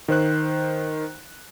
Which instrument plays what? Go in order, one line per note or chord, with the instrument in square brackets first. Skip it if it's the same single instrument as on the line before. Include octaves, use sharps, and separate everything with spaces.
[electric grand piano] D#3 C5 F#6